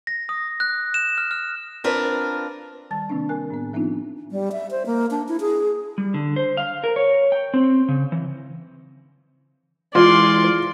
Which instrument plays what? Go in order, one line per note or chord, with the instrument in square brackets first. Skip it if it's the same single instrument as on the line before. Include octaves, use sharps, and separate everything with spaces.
[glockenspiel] A#6
D#6
F#6
E7
F6
F6
[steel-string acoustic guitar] C4 D4 F4 A#4 B4
[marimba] D#3 G3 A5 A6
C3 D#3 A#3 C4 D4
C4 A#4 G#5 F#6
A2 B3
F3 B3 C4 D4 D#4 F4
[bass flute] G3
E5
C5
A#3
D4
E4
G#4
[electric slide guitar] G3
D3
C5
F5
A#4
C#5
G5
C4
C#3
E3
[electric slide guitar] E3 G#3 [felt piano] F4 [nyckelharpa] D5 [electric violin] C6